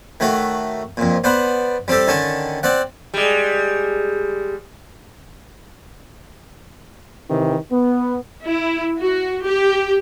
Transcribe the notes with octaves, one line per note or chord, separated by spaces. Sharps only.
D#3 A3 F#4 C#5
F2 A#2
B3 C5 D5 F#5
G3 C4 G4 A4
D3 D#3 C#4 A5 C#6
C4 D5 F#5
G3 G#3
C3 D#3 E3
B3
E4
F#4
G4